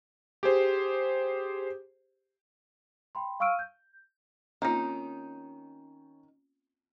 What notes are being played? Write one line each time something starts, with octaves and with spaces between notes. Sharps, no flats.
G4 G#4 C5
G5 B5 C6
F5 C#6 E6 F6 D7 D#7
G6
D#3 A#3 C4 C#4 D#4 F4